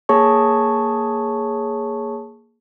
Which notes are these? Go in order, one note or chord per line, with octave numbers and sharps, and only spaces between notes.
A#3 G#4 C#5 A5 C#6